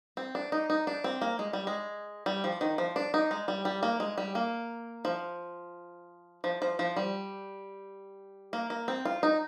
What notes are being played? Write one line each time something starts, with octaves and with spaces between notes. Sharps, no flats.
C4
D4
D#4
D#4
D4
C4
A#3
G#3
G3
G#3
G3
F3
D#3
F3
D4
D#4
G#3
G3
G3
A#3
G#3
G3
A#3
F3
F3
F3
F3
G3
A#3
A#3
C4
F4
D#4